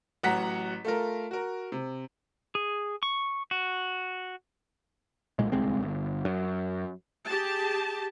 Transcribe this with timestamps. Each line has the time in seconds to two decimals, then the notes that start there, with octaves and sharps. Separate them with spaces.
0.23 A1 F#3 F#5 A#5 B6
0.85 A3 F4 A#4
1.31 F#4 A#4
1.72 C3
2.55 G#4
3.03 C#6
3.51 F#4
5.39 B1 A#2 G#3
5.52 D1 C2 G#3 C4
5.82 G1
6.25 F#2
7.26 G4 G#4 A5